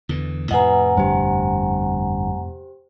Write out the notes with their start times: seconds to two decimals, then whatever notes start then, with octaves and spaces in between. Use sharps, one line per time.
0.09 E2 D3 E3
0.51 F2 A2 C3 B4 D#5 F#5 G#5 A#5
0.97 G1 G2 G4 C5